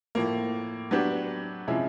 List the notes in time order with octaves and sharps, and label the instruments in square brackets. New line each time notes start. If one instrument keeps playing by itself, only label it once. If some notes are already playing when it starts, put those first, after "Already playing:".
[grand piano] A2 F3 A#3
F#3 B3 D4 G4
C3 F3 G#3 C#4 E4